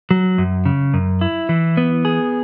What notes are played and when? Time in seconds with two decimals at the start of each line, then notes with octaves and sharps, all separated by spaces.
0.11 F#3
0.38 F#2
0.65 C#3
0.94 F#2
1.21 E4
1.49 E3
1.77 B3
2.05 G#4